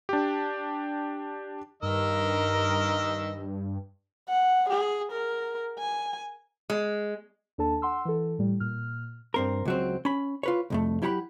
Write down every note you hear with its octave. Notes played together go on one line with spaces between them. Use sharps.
D4 G4
G2 D#3 A#4 D#5 E6
F#5
G#4
A#4
G#5
G#3
D#2 D4 A4 A5
F#5 C6 E6
E3 A4
A2 G3
A#2 F6
G2 C4 A#4
C#2 F#3 C4
C#4 B5
F4 B4 C#5
C2 F2 A3
F#3 E4 G4 F#5 A5 B5